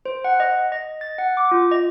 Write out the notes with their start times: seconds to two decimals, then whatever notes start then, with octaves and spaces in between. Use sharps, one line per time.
0.06 C5
0.24 F#5
0.40 D#5
0.72 D#5
1.01 A6
1.18 F#5
1.37 D6
1.51 F4
1.71 D#5